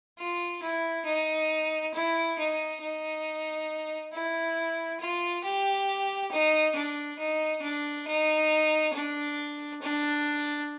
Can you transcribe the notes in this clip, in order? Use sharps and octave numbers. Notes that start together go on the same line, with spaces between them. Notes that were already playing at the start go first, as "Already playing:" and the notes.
F4
E4
D#4
E4
D#4
D#4
E4
F4
G4
D#4
D4
D#4
D4
D#4
D4
D4